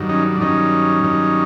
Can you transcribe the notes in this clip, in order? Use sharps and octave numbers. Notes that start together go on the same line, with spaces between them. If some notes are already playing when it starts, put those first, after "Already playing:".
Already playing: G2 D#3 F#3
C#4 D#4
D4
G2 D#3 F#3 C#4 D#4
G2 D#3 F#3